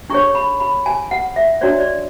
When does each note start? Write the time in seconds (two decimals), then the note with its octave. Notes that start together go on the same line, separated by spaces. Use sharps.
0.10 D4 G#4 C#5 C#6
0.35 B5
0.60 B5
0.86 G#5
1.11 F#5
1.36 E5
1.61 D4 F#4 C#5 D5
1.80 D5